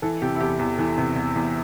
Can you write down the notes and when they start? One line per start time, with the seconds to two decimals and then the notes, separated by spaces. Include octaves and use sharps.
0.02 E3 A4
0.22 C3 G4
0.35 E4
0.41 E2 G4
0.59 E2
0.79 E3
0.98 C3
1.16 E2
1.36 E2